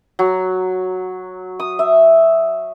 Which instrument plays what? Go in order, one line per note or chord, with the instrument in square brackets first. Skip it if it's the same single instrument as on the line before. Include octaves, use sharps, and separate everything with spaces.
[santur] F#3
D#6
E5